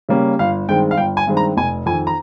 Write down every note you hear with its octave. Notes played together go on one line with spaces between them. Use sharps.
C#3 G3 A#3 C#4
G1 F5
G2 D#3 G#3 C4 G5
F5
G1 G5
G#5
G2 D#3 G#3 C4
A#5
F1 G#5
F2 D#3 G#5
A#5